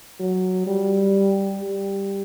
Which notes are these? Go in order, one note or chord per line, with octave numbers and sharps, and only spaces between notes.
F#3
G3
G3